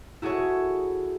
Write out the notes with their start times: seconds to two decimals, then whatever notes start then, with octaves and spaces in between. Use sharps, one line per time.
0.22 E4 F#4 G#4 A4 C#5